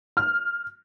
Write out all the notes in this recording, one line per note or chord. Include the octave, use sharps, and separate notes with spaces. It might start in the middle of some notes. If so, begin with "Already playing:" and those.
F6